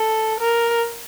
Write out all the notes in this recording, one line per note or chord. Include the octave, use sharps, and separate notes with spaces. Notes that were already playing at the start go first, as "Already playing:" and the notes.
Already playing: A4
A#4